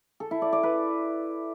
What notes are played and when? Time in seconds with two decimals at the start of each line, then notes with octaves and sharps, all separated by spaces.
0.20 A4
0.31 E4
0.42 D5
0.53 D5
0.63 B4